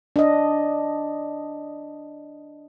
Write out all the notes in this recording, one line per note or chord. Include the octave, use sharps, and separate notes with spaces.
D4 D#5